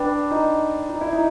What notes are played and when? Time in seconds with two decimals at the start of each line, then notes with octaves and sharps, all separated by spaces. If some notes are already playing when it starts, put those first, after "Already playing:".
Already playing: D4 B4 D5 G5 B5 D6
0.31 D#4
0.90 D#4
1.01 E4
1.13 D#4